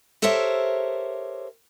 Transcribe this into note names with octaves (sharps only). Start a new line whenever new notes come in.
G4 A4 A#4 C5 C#5 E5